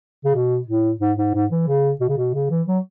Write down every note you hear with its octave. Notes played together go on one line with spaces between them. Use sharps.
C#3
B2
A2
G#2
G#2
G#2
E3
C#3
B2
C#3
B2
C#3
E3
F#3